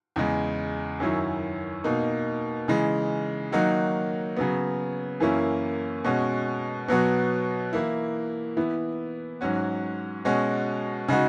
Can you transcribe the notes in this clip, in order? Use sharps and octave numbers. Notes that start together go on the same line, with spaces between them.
E2 C#3 G#3
F#2 D#3 F#3 C#4 E4
B2 A#3 D#4
C#3 E3 G#3
D#3 F#3 A#3 D#4 F#4
C#3 F#3 B3
F#2 E3 A#3 C#4 E4
B2 G#3 C#4 F#4
B2 F#3 B3 F#4
E3 A#3 E4
E3 B3 E4
G#2 F#3 C#4 F#4
B2 G#3 C#4 F#4
C#3 G#3 D#4 F#4